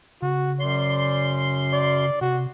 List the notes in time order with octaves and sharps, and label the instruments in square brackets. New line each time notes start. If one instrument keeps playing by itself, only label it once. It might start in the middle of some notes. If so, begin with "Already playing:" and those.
[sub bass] C#3 [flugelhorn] F#4
[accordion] F#2 C6 [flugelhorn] D5
[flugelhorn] D5
[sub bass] C3 [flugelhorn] F#4